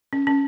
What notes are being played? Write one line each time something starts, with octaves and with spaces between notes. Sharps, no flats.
C#4
C#4